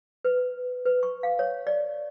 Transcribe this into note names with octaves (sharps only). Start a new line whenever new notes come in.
B4
B4
C#6
F5
C#5
D5